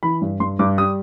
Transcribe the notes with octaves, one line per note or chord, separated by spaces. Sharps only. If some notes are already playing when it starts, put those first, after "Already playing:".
E3 B5
G2
G2 C6
G2 D6
G3 D#6